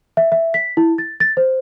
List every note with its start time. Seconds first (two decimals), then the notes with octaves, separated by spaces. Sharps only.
0.17 E5
0.32 E5
0.54 B6
0.77 E4
0.98 A6
1.20 A6
1.37 C5